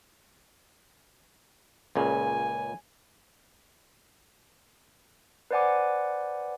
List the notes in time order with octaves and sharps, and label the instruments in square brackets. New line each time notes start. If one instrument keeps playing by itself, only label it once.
[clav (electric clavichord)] C#2 A#2 C#3 [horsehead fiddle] G#5
[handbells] B4 C5 D5 F#5 G#5 D6